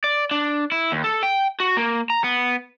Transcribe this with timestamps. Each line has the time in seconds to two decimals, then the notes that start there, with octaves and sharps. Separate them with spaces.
0.04 D5
0.31 D4
0.72 E4
0.92 D#2
1.04 A4
1.23 G5
1.60 F#4
1.77 A#3
2.10 A#5
2.24 B3